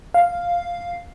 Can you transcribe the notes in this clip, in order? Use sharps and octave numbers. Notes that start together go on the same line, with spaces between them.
F5